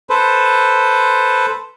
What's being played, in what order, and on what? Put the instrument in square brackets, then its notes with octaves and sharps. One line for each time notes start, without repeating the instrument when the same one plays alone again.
[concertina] A4 B4 C5